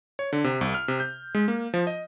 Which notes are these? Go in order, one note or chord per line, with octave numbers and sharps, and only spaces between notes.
C#5
D3
C3
C2
F6
C3
G6
G#3
A#3
F3
D#5